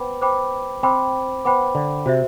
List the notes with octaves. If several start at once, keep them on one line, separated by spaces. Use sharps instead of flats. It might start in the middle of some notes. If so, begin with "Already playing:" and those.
Already playing: B3 C5 G5 B5 D6
C5 G5 B5 D6
C4 C5 G5 B5 D6
B3 C5 G5 B5 D6
D3
C3 F#4 C5 E5